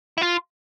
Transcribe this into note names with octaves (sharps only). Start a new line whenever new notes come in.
E4
F4